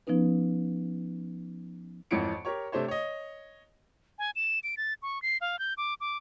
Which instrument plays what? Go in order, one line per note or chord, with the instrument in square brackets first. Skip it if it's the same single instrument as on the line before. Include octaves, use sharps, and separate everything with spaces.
[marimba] F3 B3 C#4 D#4 B4
[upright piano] G#1 F2 E3 C#5 C#7 D7
G4 A#4 C#5 C#6
C3 A3 D4 C5 C#5
C#5 D#5
[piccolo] G#5
E7
D7
A6
C#6
C7
F5
G6
D6
D6